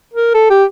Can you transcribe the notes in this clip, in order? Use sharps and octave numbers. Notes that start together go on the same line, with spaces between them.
A#4
A4
G4